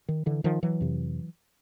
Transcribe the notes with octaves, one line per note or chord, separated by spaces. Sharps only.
D#3
D3 E3
D#3 F3
E3 F#3
F2 C3